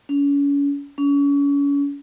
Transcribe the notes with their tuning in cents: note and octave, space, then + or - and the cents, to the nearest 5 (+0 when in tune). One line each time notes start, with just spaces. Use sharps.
C#4 +35
C#4 +35